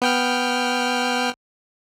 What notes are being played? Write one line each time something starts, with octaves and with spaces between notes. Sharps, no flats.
B3 G5 F6